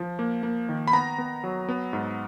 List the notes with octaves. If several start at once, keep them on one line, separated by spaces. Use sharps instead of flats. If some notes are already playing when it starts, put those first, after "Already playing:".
Already playing: F3
A#3
A#3
D#3
B5
B3 A#5
B3
F#3
B3
G#2